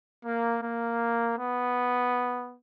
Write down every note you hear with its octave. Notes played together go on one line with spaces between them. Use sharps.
A#3
A#3
B3